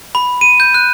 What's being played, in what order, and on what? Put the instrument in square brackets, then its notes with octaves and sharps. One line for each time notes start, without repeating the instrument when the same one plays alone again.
[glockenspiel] B5
D#7
G6
F#6